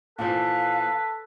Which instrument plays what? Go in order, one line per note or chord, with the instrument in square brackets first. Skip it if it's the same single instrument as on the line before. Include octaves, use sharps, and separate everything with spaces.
[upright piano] A#2 E3 F3 [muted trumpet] A4 [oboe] B4 [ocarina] F5